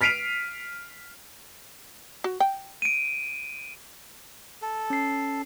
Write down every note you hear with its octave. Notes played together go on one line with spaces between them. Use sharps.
F6 B6 C7 D7 D#7 F7
F#4
G5
D7 D#7
A4
C#4 C7